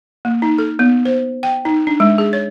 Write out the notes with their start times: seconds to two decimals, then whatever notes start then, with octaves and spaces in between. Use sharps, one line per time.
0.25 A#3
0.42 D#4
0.58 A4
0.79 B3
1.05 C5
1.43 G5
1.65 D#4
1.87 D4
2.00 G#3
2.18 G#4
2.33 C#5